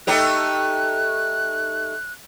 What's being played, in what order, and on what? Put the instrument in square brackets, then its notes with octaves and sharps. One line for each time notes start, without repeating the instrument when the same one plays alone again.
[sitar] A3 D#4 G4 [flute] F#6